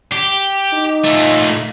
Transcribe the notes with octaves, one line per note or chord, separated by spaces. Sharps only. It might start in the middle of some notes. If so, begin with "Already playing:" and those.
G4
D#4
A#2 A3